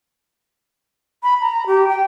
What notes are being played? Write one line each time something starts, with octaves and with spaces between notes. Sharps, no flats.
B5
A#5
G4
G5